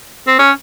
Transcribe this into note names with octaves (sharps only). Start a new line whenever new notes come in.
C4
C#4